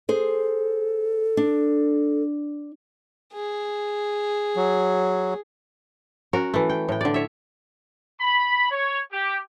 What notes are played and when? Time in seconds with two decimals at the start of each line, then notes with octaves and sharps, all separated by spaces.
0.09 G#4 A4 C5
1.37 D4
3.33 G#4
4.56 F#3
6.33 C#4 F#4 A#4
6.54 E3 A3
6.70 G5
6.89 A2 G5
7.01 D3 D5
7.14 C#5 E5
8.20 B5
8.71 C#5
9.12 G4